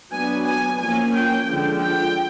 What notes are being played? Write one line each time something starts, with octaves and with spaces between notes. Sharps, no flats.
F#3 B3 D4 G#5
G#5
F3 A#3 C#4 G#5
G5
D3 F3 G#3
G5